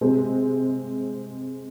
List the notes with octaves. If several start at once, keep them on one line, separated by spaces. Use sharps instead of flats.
C3 G#3 C4